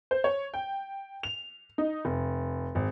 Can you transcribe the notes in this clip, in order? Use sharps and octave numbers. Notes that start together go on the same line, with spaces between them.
C5
C#5
G5
F7
D#4
F1
G#1